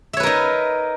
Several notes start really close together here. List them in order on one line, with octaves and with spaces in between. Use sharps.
E5 C#5 B4 A#4 D#4